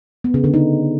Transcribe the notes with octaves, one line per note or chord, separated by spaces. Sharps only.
B3
C#3
D3
D#4